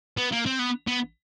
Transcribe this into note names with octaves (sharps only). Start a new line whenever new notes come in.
B3
A#3
C4
B3
B3